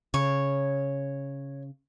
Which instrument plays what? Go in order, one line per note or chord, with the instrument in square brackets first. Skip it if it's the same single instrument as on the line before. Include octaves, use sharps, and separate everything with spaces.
[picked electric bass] C#3 [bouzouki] C#5